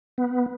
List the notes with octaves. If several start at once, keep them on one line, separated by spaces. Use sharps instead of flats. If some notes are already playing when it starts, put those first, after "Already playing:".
B3